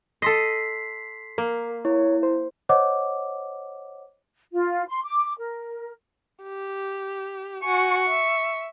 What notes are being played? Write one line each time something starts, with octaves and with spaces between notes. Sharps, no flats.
A4 D#5 C6 B6 C7
A#3 A#4
E4 C#5
C5
C5 C#5 D#5 F#5 D6
F4
C6
D6
A#4
G4
F#4 G#5 C#6
E5